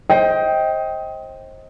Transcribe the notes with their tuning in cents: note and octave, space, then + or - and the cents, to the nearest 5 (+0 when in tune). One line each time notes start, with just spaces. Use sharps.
C5 +30 D#5 +25 G5 +0